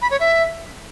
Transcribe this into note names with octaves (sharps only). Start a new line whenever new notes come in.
B5
C#5
E5